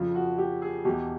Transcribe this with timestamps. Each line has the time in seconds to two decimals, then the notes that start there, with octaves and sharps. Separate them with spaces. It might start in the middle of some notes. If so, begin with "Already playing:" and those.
Already playing: F2 C#3 F3 F4
0.15 F#4
0.38 G4
0.62 G#4
0.85 E2 B2 G4